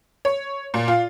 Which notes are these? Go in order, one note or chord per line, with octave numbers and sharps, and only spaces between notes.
C#5
A#2
F4